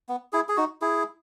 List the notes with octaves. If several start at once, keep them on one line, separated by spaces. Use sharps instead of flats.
B3
E4 G#4
G#4
D#4 F#4
E4 G#4